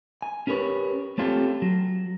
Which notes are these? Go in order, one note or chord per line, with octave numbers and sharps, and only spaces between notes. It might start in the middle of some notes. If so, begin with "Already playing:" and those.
G#5
C#4 G4 A#4 B4 C#5
A3 C4 C#4 F4 G4 A4
F#3